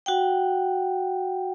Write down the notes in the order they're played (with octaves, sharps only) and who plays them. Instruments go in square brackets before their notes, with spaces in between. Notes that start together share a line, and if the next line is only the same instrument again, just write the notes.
[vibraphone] F#4 F#5 G5